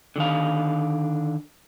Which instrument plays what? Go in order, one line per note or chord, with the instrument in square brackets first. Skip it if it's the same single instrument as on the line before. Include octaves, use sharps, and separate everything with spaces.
[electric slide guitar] D3 D#3 F5